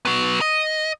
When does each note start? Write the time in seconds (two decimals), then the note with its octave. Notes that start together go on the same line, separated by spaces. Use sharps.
0.05 F#3 B3
0.41 D#5